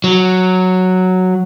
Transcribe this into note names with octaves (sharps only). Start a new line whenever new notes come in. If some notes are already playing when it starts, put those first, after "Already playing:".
F#3